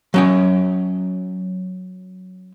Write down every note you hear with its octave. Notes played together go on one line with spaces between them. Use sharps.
F#3 C#4 G5